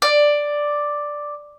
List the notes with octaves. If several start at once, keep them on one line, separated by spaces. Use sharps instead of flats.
D5